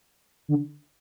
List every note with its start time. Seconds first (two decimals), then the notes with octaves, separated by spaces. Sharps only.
0.48 D3